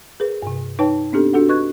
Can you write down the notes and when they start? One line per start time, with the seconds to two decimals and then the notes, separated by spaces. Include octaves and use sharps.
0.20 G#4 A#4 B4
0.42 G2 C3
0.79 D#4 B4 C#5 G5 A5
1.12 B3 C4 D4 G4 A4
1.33 D4 F#4 A4 F#5
1.49 B4 D#5 C#6 F#6 G#6